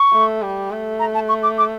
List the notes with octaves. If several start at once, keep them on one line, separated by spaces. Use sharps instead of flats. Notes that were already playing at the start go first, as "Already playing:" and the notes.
Already playing: C#6
A3
G3
A3
A#5
A5
C#6
D6
D6